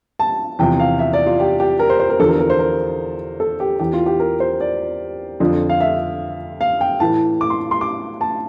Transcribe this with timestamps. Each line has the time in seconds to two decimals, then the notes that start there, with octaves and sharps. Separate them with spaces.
0.19 A5
0.59 E2 C3 F3 G5
0.80 F5
0.99 E5
1.13 D5
1.26 F4
1.40 G4
1.60 G4
1.79 A#4
1.90 C5
2.00 C5
2.10 A#4
2.19 E2 D3 F3 A4
2.29 A#4
2.39 A#4
2.50 C5
2.59 A#4
3.40 A4
3.60 G4
3.80 E2 E3 G4
3.93 F4
4.06 G4
4.20 A#4
4.40 C5
4.60 D5
5.40 F2 D3 F3
5.69 F5
5.80 E5
6.61 F5
6.81 G5
7.00 A2 E3 A5
7.41 D6
7.50 C6
7.71 C6
7.81 D6
8.21 A5